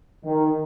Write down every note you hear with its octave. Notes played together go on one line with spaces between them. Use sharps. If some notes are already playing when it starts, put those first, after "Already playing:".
D#3